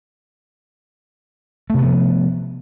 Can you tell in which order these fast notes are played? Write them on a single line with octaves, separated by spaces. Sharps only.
A3 C3 B3 F3